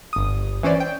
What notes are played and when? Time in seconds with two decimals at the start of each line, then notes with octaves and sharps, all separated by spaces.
0.13 G1 D#6
0.63 E3 C#4 C5 D5
0.80 G5